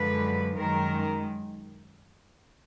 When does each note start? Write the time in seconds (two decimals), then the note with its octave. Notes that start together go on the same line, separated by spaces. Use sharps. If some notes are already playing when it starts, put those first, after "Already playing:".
Already playing: F#2 D3 F3 G#3 B4
0.57 F#2 D#3 G#3 A#4